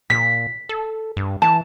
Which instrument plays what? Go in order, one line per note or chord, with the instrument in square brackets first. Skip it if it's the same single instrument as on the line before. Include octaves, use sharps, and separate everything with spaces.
[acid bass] A#2 [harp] B6
[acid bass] A4
G2
[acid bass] E3 [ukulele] A5